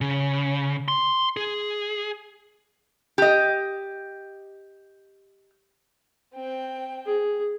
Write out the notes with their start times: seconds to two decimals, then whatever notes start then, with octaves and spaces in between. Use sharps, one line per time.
0.01 C#3
0.88 C6
1.37 G#4
3.18 G4 D#5
6.34 C4 G5
7.06 G#4